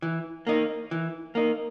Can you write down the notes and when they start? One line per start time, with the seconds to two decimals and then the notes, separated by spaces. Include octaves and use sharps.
0.02 E3
0.47 A#3 D#4
0.91 E3
1.35 A#3 D#4